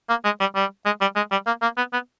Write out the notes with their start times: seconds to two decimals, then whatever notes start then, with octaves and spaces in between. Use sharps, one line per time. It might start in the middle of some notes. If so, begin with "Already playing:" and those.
0.09 A#3
0.25 G#3
0.40 G3
0.55 G3
0.86 G#3
1.01 G3
1.16 G#3
1.32 G3
1.47 A#3
1.62 A#3
1.77 B3
1.93 B3